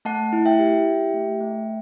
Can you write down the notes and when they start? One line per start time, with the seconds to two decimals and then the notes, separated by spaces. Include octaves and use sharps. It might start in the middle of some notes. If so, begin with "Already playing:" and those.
0.05 A3 F#5 A5
0.33 E4
0.46 E5 G5
0.59 G4
0.86 G4
1.14 A3
1.41 A3